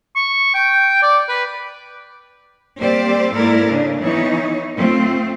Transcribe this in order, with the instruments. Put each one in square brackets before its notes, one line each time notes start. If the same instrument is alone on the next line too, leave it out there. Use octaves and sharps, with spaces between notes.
[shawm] C#6
G5
D5
B4
[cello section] G3 A#3 C4 G4 C5 D5
G#2 A#3 E4 A4 A#4 D5
C#3 D4
E3 B3 D#4 C#5
A3 C4 F4